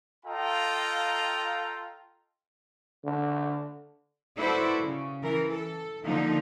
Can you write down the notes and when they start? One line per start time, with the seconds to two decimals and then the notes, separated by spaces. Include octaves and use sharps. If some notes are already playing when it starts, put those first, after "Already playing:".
0.25 F4 A4 D#5 F5 G5 A#5
3.05 D3
4.38 E4 F#4 A4 B4 C5 D5
4.78 C#3
5.23 E3 A#4
5.52 A4
6.04 D3 F3 A#3 D#4